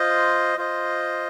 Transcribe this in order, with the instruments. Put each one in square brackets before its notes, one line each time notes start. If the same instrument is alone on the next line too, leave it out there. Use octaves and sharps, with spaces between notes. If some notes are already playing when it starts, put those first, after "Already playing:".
Already playing: [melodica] F4 C5 D#5
F4 C5 D#5